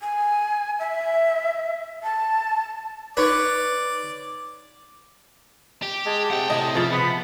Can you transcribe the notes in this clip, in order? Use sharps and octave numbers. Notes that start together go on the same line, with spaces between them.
G#5
E5
A5
D#4 B4 C#5 D5 D6
G4
G#3 A5
C3 F#5 G5
A2 C3 D#5
C#3 F3 E5 A6
B3 B5